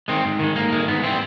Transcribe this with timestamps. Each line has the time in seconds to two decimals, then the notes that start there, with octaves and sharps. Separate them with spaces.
0.08 D#3 G#3 C4
0.25 G#2
0.39 D#3 G#3
0.56 G#2 A#3
0.72 D#3 G#3
0.88 G#2 B3
1.03 E3 G3 C4